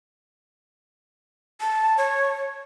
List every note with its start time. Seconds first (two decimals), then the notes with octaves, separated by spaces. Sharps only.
1.61 A5
1.98 C#5